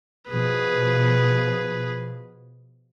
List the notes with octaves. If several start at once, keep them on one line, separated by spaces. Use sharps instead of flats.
B2 F3 G#4 B4